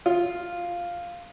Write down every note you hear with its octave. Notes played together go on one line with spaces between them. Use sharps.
F4